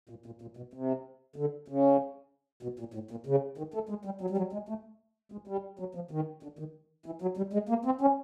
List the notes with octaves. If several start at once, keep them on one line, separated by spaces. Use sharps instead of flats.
A#2
A#2
A#2
B2
C3
D3
C#3
B2
A#2
A2
A#2
C#3
D#3
A3
G#3
G3
F#3
G3
F#3
G#3
A3
G#3
G3
F#3
F3
D#3
D3
D#3
E3
F#3
G3
G#3
A#3
C4
C#4